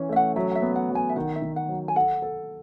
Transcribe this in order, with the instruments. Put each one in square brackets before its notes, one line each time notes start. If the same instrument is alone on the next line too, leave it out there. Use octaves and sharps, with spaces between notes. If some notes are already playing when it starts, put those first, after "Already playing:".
Already playing: [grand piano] E3 C#4
[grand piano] A3 [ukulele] E5
[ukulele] F#5
[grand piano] F#3 [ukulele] E5
[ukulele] F#5
E5
[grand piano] B3
[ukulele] F#5
[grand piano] F#3
[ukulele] G#5
E5
[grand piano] D#3 [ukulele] F#5
[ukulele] E5
[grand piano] D#3
[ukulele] F#5
[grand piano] F#3
[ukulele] G#5
[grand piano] A4 [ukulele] F#5
[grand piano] A4